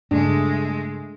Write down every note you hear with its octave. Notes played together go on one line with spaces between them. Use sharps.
G2 C#3 G#3 A3 D4